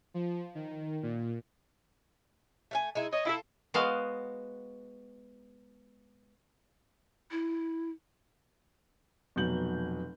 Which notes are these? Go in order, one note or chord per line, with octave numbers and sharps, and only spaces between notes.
F3
D#3
A#2
A3 F5 G#5
G#3 D#4 E4
C#5 D#5
E4 F4 A4
G#3 B3 F#4 F5
E4
F1 B2 F#3 G6 F#7